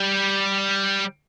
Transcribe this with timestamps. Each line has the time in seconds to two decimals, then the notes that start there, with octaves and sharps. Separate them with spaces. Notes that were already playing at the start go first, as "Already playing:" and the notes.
Already playing: G3